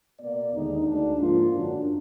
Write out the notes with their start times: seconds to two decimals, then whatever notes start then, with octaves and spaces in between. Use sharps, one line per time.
0.19 B2 A#3 D5
0.53 D#2 D3 G#3 D#4
0.86 D2 D3 G#3 D4
1.20 G#2 F3 A#3 F4
1.53 F#2 D3 F#3 D4